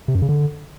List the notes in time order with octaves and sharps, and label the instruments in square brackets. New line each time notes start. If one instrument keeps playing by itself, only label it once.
[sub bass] C3
F#2
C#3
D3